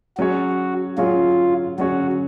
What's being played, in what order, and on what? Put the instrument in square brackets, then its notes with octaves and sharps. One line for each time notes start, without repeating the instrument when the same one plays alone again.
[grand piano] F#3 C#4 G#4 C#5 [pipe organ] F#4
[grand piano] F#3 C#4 G#4 C#5 [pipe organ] F4
[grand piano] F#3 C#4 G#4 C#5 [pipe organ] F#4